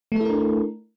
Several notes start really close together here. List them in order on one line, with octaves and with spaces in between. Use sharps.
A3 A4 E4 A#4 D4